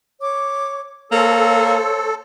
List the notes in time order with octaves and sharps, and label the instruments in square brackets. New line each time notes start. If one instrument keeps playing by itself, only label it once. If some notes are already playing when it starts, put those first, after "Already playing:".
[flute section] C#5 D6
[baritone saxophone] A#3 [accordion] A4 [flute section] C5 C#5 E6